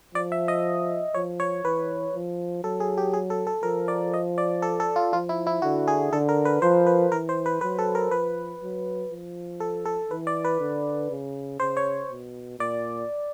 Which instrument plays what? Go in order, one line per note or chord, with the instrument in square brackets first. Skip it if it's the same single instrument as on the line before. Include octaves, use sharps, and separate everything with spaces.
[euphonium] F3 [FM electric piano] D5
[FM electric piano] E5
D#5
[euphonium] F3 [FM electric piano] C#5
[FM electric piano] C#5
[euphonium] E3 [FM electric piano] B4
[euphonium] F3
[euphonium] F#3 [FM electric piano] A4
[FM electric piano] G#4
G4
G#4
A4
A4
[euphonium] F3 [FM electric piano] A#4
[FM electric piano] D5
D#5
D5
A4
A4
F4
[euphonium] F3 [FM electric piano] F4
[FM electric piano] E4
E4
[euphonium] D3 [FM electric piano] F#4
[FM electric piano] G#4
[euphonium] D3 [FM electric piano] A4
[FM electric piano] A#4
B4
[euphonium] F3 [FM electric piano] C5
[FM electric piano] B4
[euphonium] E3 [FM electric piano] A#4
[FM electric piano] C5
B4
[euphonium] F#3 [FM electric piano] B4
[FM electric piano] A4
A#4
[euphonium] F3 [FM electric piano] B4
[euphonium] F#3
F3
[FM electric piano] A4
A4
[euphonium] E3 [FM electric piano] B4
[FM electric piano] D5
B4
[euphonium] D3
C#3
[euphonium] C#3 [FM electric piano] C5
[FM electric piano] C#5
[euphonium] B2
[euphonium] A#2 [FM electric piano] D5